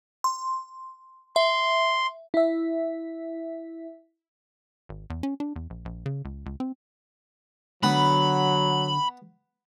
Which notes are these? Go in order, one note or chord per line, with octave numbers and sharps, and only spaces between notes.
C6
E5 C6
E4 E5
G#1
E2
C#4
D4
E2
A#1
A#1
C#3
C#2
C#2
C4
D3 F#3 B3 B5